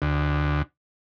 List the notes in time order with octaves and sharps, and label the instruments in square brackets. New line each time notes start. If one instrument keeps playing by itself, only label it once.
[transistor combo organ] D2